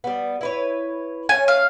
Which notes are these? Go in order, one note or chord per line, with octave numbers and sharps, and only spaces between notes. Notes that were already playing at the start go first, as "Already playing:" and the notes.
G3 B3
E4 B4 C#5
A3 C#4 G#5
F5